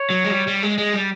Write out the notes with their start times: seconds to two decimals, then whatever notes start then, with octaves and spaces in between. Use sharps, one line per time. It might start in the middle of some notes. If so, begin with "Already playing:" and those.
Already playing: C#5
0.10 F#3
0.24 G#3
0.31 G3
0.47 G3
0.63 G#3
0.78 G#3
0.94 G3